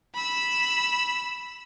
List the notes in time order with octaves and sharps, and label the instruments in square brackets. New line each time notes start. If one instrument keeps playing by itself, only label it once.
[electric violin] B5 E6